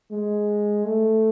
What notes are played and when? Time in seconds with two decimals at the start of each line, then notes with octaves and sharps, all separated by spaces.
0.11 G#3
0.86 A3